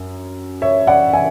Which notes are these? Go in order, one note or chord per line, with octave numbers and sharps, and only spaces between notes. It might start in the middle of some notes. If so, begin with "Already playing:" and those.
Already playing: F#2
C#5 E5
D5 F#5
E5 G#5